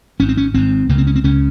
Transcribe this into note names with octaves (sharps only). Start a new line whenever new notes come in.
G#1 G#2 C#4
C4
C#4
G#1 G#2 C4
C#2 C#3 A#3
C4
C#4
C4
C#2 C#3 C#4